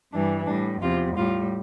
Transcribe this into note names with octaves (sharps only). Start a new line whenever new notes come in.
G2 E3 G3 D4
A2 G3 D4
E2 C3 F3 F4
A2 G3 F4